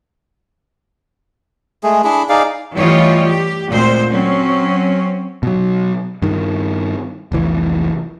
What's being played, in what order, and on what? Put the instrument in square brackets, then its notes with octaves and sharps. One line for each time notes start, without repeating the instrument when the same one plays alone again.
[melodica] G#3 A3 G#4
D4 E4 G#4 B5
D#4 G#4 D5 F5
[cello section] E3 G3 A3 F4 C#5 D#5
G4
D2 A#2 G#3 C4 C5
F#3 C4 C#4
[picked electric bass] B2 F#3
G2 D#3
F1 C2 E3